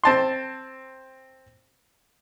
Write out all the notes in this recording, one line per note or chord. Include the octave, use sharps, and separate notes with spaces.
C4 A5 C6